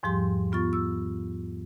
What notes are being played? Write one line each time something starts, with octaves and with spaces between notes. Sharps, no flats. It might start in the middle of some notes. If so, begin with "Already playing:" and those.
E2 G#2 F3 G3 G4 C6
B3 F4 C#6 A6
E6